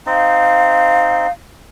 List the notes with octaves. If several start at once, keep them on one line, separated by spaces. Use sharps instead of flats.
C4 D#4 F5